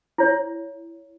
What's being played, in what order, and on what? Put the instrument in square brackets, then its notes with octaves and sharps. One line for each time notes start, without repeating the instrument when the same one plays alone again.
[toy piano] E4 C#5